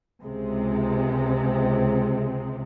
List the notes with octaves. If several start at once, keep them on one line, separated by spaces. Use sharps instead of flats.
C#2 C3 G#3